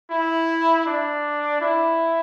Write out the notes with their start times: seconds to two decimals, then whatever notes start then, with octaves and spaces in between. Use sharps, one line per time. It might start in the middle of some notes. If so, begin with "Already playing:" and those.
0.10 E4
0.86 D4
1.61 E4